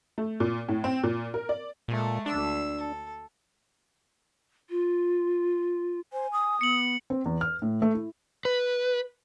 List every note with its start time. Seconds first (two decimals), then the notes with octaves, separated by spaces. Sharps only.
0.18 A3
0.40 A#2
0.68 A2
0.84 C4
1.03 A#2
1.34 A#4
1.49 D5
1.88 A#2 G#3 A3 A4
2.26 D2 D4 E6
2.77 A4
4.70 F4
6.13 C5 G#5
6.32 D#6
6.61 B3 C#7 F#7
7.10 C4
7.25 E2
7.41 F6
7.62 A2
7.82 A3
7.94 E4
8.45 B4